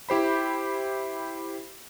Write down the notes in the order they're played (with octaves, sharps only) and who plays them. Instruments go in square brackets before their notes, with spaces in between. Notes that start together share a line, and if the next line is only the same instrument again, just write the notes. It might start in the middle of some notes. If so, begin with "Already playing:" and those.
[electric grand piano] E4 G4 C5 B5